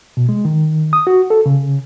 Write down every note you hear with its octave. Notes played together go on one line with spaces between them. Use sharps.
B2
G#3
D#3
D#6
F#4
A4
C#3